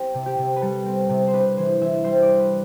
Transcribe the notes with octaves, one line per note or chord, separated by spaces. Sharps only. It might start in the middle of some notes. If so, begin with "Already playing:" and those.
Already playing: C4 G4
C3
G4
C3
B4
G3 A4
C4
C3
C5
D4 B4
E3 C5
E3 E5
G3 C5
D5
D4
B4